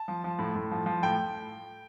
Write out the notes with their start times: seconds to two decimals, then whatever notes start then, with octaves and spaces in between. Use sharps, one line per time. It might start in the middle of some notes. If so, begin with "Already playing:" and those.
Already playing: A5
0.08 F3
0.24 F3
0.39 A2
0.55 A2
0.71 F3
0.86 F3
1.03 A2 G5